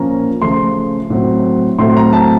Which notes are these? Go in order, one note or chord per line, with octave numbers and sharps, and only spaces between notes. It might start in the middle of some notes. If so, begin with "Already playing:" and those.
Already playing: A#2 F3 A#3 C#4 A#5
C#3 F3 A3 C6
A2 F#3 C4
A2 F#3 A3 C4 C6
A#5
A5